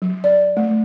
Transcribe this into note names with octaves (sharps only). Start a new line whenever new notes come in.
F#3
D5
A3